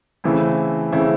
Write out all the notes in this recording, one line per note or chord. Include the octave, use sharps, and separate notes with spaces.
C#3 E3 A3 C4 E4
C#3 E3 A3 C4 E4